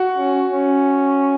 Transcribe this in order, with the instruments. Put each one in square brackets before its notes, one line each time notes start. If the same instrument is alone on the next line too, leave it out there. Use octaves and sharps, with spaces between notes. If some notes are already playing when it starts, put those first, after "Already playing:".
Already playing: [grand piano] F#4 F#5
[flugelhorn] C#4
C#4